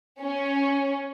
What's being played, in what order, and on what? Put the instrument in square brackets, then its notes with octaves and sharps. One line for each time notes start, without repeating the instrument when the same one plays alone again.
[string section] C#4